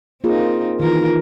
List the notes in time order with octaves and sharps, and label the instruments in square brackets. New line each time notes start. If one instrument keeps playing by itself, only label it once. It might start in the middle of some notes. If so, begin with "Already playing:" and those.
[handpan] A#3 F4 G#4 [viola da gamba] C4 D#4
[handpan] D#3 E3 [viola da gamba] F4 A#4